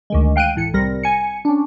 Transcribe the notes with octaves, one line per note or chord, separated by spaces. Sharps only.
D2 D#3 G#3
F5 G5 F#6 D7 D#7
A1 A2 C#7
C2 C3 G3 A#4 A#6
G#5 C#7
C#4 D4